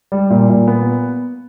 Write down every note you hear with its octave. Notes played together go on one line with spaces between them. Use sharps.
G3
A#2
A#2
B3